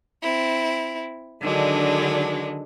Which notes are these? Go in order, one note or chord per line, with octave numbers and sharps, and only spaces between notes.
C4 E4
D3 D#3 F#3 G#3 D4